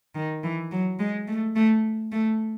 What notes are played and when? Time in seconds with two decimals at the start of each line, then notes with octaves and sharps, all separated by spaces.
0.15 D#3
0.43 E3
0.71 F#3
0.99 G#3
1.28 A3
1.56 A3
2.12 A3